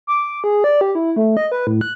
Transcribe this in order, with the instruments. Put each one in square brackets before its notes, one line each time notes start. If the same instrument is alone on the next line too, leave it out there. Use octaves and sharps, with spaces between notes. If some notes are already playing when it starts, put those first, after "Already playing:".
[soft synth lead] D6
G#4
D5
G4
E4
A3
D#5
B4
A2
F#6